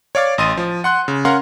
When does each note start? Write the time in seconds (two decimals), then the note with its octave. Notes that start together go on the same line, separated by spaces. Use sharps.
0.15 C#5 D5 F5 D6 A6
0.38 A1 D#5 C6 A6 D#7
0.57 F3
0.84 F#5 C6 F#6
1.08 C#3
1.25 C#4 A#4 F5 F#5 A#5 C6